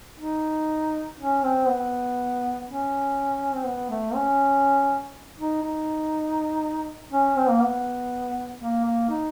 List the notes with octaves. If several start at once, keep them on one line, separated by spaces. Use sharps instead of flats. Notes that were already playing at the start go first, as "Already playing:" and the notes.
D#4
C#4
C4
B3
C#4
C4
B3
A3
C#4
D#4
D#4
C#4
C4
A#3
B3
A#3
A#3
D#4